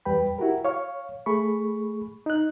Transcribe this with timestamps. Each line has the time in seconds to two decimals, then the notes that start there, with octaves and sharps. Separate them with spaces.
0.05 E2 G3 B4 G5 B5
0.38 E4 F#4 G4 A#4
0.65 C#5 F5 C#6
1.26 A3 G#4 B5 C#6
2.26 D#4 F#6